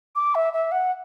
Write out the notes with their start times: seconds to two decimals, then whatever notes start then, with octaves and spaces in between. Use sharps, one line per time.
0.15 D6
0.35 E5
0.53 E5
0.72 F#5